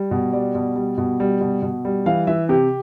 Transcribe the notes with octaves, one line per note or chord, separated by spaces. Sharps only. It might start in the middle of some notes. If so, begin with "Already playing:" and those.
Already playing: G3
B2
G3 D5
B2
G3
B2
G3
B2
B2
G3
E3 F5
E3 E5
C3 G4